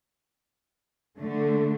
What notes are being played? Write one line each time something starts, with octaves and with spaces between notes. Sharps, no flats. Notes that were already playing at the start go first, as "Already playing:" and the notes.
D3 A3